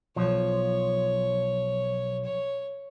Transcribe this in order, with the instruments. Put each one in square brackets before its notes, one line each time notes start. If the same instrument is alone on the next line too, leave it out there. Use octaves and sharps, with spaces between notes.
[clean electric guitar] B1 F3 [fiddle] C#5
[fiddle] C#5